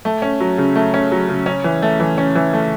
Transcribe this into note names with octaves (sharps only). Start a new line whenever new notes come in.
A3
C#4
F#3
C#3
A3
C#4
F#3
C#3
C#4
E3
A3
E3
C#4
E3
A3